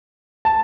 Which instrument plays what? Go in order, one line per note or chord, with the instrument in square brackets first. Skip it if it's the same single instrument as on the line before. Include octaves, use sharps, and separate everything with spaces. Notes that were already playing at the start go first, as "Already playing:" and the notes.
[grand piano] A5